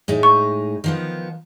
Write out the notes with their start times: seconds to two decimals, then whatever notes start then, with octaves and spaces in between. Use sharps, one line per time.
0.08 A2 G#3 D#4
0.23 C#6
0.84 D#3 F3 B3